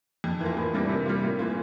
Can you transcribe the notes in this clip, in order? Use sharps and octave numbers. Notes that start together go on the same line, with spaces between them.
F2
E3 A#3 F4
A2
E3 G3 A#3 D4
C3
G3 A#3 F4
A2
E3 A#3 F4